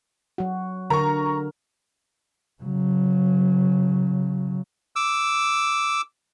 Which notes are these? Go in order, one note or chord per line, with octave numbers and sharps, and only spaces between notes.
F#3 F#4
D3 A#4 A#5 C#6
C#3 F#3
D6 E6